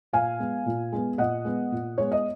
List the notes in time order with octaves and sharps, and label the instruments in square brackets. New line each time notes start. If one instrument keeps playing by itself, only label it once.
[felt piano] A#2 F5 G#5
G#3 B3
A#2
G#3 B3
A#2 D#5 F#5
G#3 B3
A#2
G#3 B3 C#5
D#5